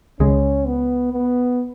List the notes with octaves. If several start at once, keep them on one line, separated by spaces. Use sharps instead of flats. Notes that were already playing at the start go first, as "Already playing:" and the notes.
C#2 C#3 G#3 C#4
B3
B3